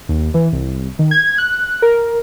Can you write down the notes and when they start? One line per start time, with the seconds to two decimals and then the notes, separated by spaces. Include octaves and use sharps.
0.09 D#2
0.34 E3
0.52 C2
0.99 D#3
1.11 G#6
1.38 F#6
1.82 A#4